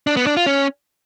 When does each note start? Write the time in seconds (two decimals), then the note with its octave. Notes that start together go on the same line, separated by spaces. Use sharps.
0.07 D4
0.17 B3
0.27 D4
0.37 F4
0.46 C#4